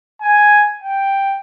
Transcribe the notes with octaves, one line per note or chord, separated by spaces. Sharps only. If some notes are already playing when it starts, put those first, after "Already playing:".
G#5
G5